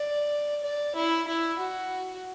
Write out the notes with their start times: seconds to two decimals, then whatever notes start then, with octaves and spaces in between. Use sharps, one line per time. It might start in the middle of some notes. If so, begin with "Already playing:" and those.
Already playing: D5
0.64 D5
0.96 E4
1.28 E4
1.60 F#4